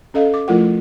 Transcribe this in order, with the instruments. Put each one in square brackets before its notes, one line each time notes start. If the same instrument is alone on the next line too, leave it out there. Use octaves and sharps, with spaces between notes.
[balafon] C#4 A4 D#5 F5
D6
F3 A3 E4 F4 A#4 F#5